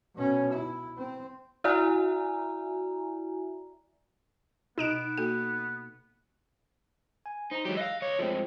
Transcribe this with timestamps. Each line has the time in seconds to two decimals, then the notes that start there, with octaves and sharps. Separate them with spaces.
0.15 B2 C#4
0.53 E4
0.98 C4
1.64 E4 F#4 D5 E5 G#5 A#5
4.78 B2 B3 D#4 D7 E7
5.18 A#3 F#4 A4
7.26 G#5
7.51 D#4 C5 A#5
7.65 E3 F#3 G#3 G4
7.77 D#5 F5 E6 F#6 A#6
8.01 C#2 C#5
8.19 G2 F3 G#3 A3 C4